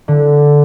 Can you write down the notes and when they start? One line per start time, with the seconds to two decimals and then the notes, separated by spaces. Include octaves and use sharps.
0.08 D3